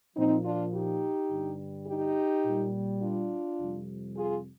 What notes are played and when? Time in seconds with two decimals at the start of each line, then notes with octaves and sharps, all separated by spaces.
0.16 A#2 F3 C4 D#4
0.45 D4 F4
0.73 D#4 G4
1.30 G2 D3 G3
1.87 D#4 G4
2.45 A#2 G3
3.02 D4 F4
3.60 F2 C3 G3
4.17 F4 G#4